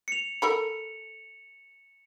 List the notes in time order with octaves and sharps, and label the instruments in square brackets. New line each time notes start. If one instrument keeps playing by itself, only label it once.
[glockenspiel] C#7 F7
[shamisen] A4 A#4 B5 [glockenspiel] C#7